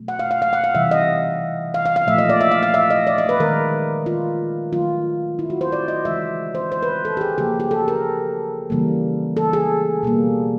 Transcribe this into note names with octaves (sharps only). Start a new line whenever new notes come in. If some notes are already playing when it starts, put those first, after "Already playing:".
Already playing: B2 F#3 A3
F#5
F5
F5
F5
F#5
F5
C3 E3 G3 E5
D#5
F5
F5
F5
A#2 F3 A3 E5
D#5
D5
E5
F5
F5
E5
D#5
D5
D#5
B4
D#3 G#3 A#4
F4
D#3 F#3 A3 F4
E4
F#4
C5
D5
D#5
C#3 E3 G#3 E5
C5
C5
B4
A4
G4
G#4
C#3 F3 A#3 G4
G4
A4
A#4
C#3 E3 G3 A#3
A4
G#4
B2 G3 A#3